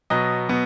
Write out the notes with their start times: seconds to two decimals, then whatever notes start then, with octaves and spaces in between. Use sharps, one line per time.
0.10 B2 F#3 B3 D#5
0.49 B2 F#3 B3